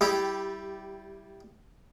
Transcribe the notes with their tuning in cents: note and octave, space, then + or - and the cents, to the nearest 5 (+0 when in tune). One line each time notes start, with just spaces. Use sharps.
G3 -15 E4 +0 G4 +5